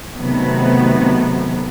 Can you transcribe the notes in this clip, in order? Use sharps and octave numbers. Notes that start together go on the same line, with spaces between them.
C3 D#3 F#3 A3 B3